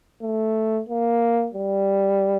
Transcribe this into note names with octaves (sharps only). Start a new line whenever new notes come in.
A3
A#3
G3